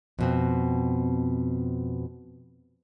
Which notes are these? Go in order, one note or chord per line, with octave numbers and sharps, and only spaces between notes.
F2 B2 C4